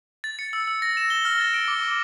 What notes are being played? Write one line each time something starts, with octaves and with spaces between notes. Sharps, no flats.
A6
C#7
E6
E6
A#6
E7
G7
F6
A6
D7
D6
D6